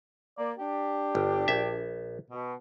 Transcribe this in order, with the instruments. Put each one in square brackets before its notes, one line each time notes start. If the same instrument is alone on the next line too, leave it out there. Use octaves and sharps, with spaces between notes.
[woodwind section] A#3 D5
D4 G4
[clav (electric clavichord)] G1
A#1 E5
[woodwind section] B2